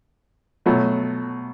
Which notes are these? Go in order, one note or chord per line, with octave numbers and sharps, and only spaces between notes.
B2 F#3 A3